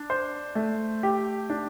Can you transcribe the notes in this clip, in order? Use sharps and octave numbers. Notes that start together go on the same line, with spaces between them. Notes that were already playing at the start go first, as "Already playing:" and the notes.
Already playing: D4
C5
A3
G4
D4